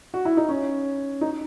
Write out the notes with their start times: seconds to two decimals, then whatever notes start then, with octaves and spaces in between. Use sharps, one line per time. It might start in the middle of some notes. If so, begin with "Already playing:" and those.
0.14 F#4
0.25 E4
0.37 D#4
0.49 C#4
1.21 D#4